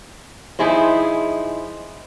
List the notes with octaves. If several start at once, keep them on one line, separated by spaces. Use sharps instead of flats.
F3 D#4 E4 G#4 C5